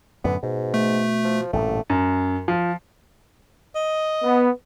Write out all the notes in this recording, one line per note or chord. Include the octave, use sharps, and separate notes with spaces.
F#2 A2 D3 B3
G#2 B2
A3
F3
A1 G2 A#2 A3
F#2
F3
D#5
B3